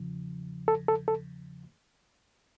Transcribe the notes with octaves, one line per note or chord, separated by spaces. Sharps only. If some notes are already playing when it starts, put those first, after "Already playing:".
Already playing: E2 C#3 F3
A4
A4
A4